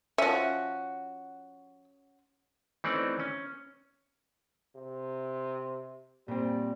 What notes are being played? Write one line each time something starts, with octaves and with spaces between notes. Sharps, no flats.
F3 C#4 F#4 E5
E3 A3 C4 C#4 D#4 D5
C#4
C3
A#2 G3 C4